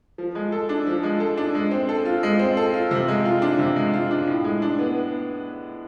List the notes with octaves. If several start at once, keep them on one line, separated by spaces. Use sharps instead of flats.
F3
G#3
A4
D4
F3
G#3
A4
D4
G#3
C4
A4
F4
G#3
C4
A4
F4
C3
G#3
F4
D4
C3
G#3
F4
D4
A2
G#3
D4
B3